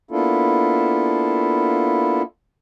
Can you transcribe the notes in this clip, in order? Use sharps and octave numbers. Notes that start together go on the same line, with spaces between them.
A#3 B3 D4 E4 F4 A4